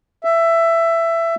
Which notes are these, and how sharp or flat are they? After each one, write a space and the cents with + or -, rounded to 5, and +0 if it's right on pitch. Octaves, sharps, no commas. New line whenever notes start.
E5 +15